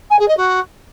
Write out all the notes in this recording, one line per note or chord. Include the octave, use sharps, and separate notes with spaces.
G#5
G#4
D#5
F#4